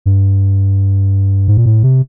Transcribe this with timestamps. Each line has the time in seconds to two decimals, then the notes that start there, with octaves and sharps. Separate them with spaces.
0.06 G2
1.48 G#2
1.57 A#2
1.66 A2
1.83 C3